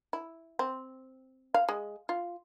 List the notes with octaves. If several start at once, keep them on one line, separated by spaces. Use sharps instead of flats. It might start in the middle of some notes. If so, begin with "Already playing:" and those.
E4
C4
F5
G#3
F4